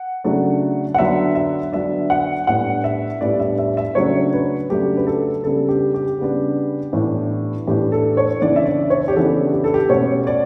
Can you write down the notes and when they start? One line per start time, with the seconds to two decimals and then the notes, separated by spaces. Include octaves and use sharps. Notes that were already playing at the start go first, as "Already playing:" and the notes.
Already playing: F#5
0.24 C#3 F#3 A3 D4
0.94 F#5
0.98 D3 F#3 B3 D4 E5
1.35 E5
1.72 D3 F#3 B3 D4 E5
2.10 F#5
2.47 A2 G3 B3 D4 F#5
2.84 E5
3.21 A2 G3 B3 D4 D5
3.40 E5
3.58 E5
3.77 E5
3.95 C#3 F#3 A3 D4 C#5
4.33 B4
4.69 C#3 F#3 A3 D4 G4
4.97 B4
5.07 A4
5.44 C#3 G3 B3 D4 A4
5.69 G4
5.94 G4
6.18 C#3 G3 B3 D4
6.93 A2 E3 B3 D4
7.67 A2 E3 B3 D4 G4
7.92 A4
8.17 C#5
8.41 C#3 E3 B3 D4 D5
8.56 E5
8.66 D5
8.90 C#5
9.08 G4
9.15 C#3 E3 B3 D4 A4
9.53 G4
9.64 A4
9.74 G4
9.89 B2 A3 C#4 C#5
10.27 D5